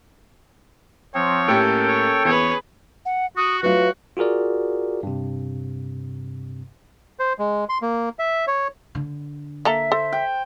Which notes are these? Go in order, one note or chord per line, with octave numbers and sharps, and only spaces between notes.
F3 C4 C#5
A2 A#3 C#4 G4 A4 G5
C#5
E2 G#4 B4 C#5
F#5
F#4 D#6
F#3 A3 F4 F#4 B4
F4 F#4 G#4 A#4 D5
G2 C3
C5
G#3
C6
A#3
E5
C#5
D3
A#3 A4 E5 A#5
A4 C5
G5